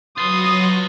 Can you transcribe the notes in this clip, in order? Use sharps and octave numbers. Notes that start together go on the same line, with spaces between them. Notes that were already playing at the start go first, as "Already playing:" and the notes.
F#3 F4 B4 C#5 C6 D#6 A#6